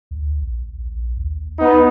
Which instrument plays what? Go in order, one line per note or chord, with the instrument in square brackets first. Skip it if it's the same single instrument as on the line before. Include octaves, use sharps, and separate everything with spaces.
[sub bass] D2
A#1
D#2
[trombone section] B3 D#4